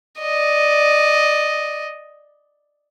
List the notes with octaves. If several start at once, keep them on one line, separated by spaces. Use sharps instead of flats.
D5 D#5